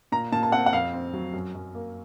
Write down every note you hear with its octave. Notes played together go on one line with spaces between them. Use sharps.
A#2 A#5
A#2 A5
A5
C4 F#5
F#5
F2 F5
C4
F#3
F#2
F#2
A#3